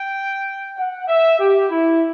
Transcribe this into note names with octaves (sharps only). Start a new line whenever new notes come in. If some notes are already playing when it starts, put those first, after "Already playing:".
Already playing: G5
F#5
E5
G4
E4